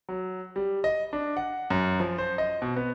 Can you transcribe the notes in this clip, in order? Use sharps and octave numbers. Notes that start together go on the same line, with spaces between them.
F#3
G3
D#5
D4
F#5
F#2
F3
C5
D#5
B2
B3